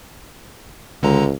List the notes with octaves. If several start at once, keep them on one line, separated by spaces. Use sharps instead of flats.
C#2 D3 G#3 A#5